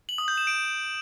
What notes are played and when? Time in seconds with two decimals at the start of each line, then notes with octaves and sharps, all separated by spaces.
0.09 F#7
0.18 D#6
0.28 G6
0.38 E7
0.47 D7